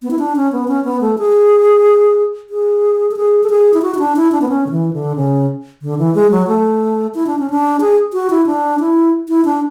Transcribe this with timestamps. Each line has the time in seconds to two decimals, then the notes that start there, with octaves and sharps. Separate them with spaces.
0.02 B3
0.10 E4
0.19 D4
0.36 C#4
0.52 B3
0.68 C#4
0.84 B3
1.01 A3
1.18 G#4
2.50 G#4
3.11 A4
3.16 G#4
3.43 A4
3.50 G#4
3.73 E4
3.82 F#4
3.94 E4
3.99 D4
4.16 E4
4.32 D4
4.41 B3
4.49 C#4
4.66 D3
4.71 E3
4.93 D3
5.16 C#3
5.82 D3
5.98 E3
6.15 G#3
6.31 F#3
6.47 A3
7.14 E4
7.27 D4
7.39 C#4
7.50 D4
7.81 G#4
8.13 F#4
8.30 E4
8.46 D4
8.80 E4
9.28 E4
9.45 D4